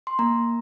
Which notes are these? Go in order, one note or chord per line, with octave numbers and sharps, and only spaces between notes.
C6
A#3 A#5